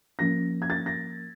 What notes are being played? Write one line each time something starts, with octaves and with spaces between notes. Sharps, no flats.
F3 A#3 C#4 A#6
G#6
A6
A#6